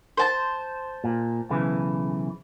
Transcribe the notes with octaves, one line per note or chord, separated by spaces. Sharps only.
C5 A5
A#2
B1 C#3 E3